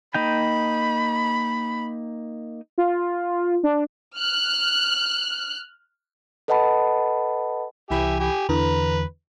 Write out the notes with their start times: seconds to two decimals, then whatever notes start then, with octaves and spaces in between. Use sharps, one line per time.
0.14 A#3 D#4 G5 B5
2.78 F4
3.63 D4
4.15 F6 F#6
6.48 A4 B4 D#5 F#5 A5 B5
7.91 C2 E3 G4 E5 G#5 B5
8.19 G4 G#5
8.49 E2 D3 E3 B4 A#5